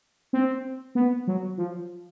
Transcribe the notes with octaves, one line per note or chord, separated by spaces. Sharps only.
C4
B3
F#3
F3